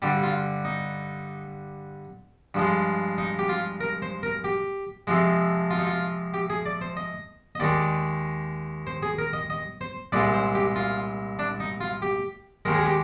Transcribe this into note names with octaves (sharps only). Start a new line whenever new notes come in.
G2 D3 G3 G4
F4
D#4
G2 F3 G#3
D#4
G4
F4
A#4
C5
A#4
G4
F2 C3 F3 G#3
F4
D#4
F4
G4
G#4
D5
C5
D#5
D#5
D#2 D#3 G#3 D5
C5
G#4
A#4
D#5
D#5
C5
C2 A#2 G#3 D5
C5
G4
F4
D4
D#4
F4
G4
D#2 D#3 G#3 A#4
G#4
G4